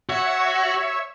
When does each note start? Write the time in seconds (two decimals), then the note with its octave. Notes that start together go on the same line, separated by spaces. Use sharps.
0.09 F#4 C#5 E5